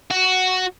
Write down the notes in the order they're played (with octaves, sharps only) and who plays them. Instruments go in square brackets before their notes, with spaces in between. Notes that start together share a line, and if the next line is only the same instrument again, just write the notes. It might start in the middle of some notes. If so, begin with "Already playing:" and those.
[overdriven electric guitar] F#4